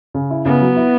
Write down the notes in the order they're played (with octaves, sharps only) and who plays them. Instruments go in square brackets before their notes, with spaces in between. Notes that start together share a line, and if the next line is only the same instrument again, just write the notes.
[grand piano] C#3
E4
[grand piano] C#3 [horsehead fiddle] B3
[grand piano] F#3
E4